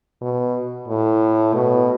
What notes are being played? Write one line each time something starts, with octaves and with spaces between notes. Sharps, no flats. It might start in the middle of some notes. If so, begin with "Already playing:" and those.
B2
A2
B2